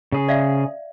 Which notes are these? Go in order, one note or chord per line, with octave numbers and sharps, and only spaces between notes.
C#3 G#4
D5 E5 F5